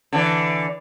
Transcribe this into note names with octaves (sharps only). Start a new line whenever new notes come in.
D3 E3